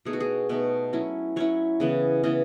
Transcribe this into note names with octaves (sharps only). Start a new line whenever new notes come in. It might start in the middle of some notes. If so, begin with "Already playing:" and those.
B2 A3 D#4 G#4
F#4
G#4
B2 A3 D#4 B4
F#3 C#4 E4
F#3 C#4 E4 C#5
C#3 E3 B3
C#3 E3 B3 D#5